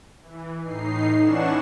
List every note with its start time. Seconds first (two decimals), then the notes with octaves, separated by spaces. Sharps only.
0.22 E3
0.60 A2 D#4 C7
1.19 E3 C#4 D4 F#5 C#6 E7